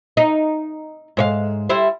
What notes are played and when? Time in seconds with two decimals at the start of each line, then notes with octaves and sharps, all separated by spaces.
0.17 D#4
1.17 G#2 C#5 F5
1.69 G3 E4 C5